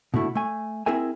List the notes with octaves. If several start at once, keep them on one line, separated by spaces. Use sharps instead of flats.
B2 D3 A3 E4
A3 G#5
C4 E4 G#4 A#4 E5 G#5